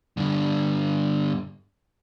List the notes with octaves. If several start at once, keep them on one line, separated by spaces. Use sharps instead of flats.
G2 D3